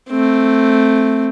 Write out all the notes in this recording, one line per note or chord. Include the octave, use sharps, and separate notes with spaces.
A3 C4